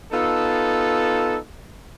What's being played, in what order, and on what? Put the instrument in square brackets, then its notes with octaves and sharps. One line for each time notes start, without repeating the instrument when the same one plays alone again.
[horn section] B3 D#4 F4 A4